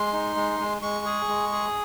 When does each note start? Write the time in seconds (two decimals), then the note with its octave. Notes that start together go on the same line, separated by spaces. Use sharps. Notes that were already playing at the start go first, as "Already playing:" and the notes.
Already playing: G#3 C6
0.13 D#4
0.36 G#3
0.60 G#3
0.82 G#3 C#6
1.06 G#4
1.28 G#3
1.52 G#4